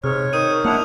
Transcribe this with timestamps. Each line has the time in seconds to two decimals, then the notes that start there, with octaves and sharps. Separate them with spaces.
0.04 G#2 C3 C#5 F6
0.33 D#3 D#6 G6 D#7
0.65 A#3 D4 E4 F#5 D#6 F7